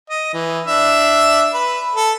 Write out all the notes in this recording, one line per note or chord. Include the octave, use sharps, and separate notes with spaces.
D#5
E3
D4 E5
B4
A4